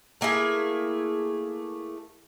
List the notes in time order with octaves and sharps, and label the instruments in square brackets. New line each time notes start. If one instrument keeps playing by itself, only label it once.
[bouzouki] A3 A#3 E4 G#4